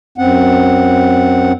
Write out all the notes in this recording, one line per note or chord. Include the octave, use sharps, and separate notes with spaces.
F#2 C4 F#5